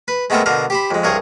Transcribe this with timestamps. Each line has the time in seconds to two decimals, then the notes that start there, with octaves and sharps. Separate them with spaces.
0.08 B4
0.30 G#3 A3 B3 C4 A4 A#4
0.46 B2 D3 A#4 F5
0.70 G4 C5 B5
0.91 F2 G#3
1.03 C2 G2 G#4 A#4 C#5